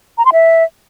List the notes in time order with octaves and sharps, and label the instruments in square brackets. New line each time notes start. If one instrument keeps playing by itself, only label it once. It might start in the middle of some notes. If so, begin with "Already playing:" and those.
[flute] A#5
C6
E5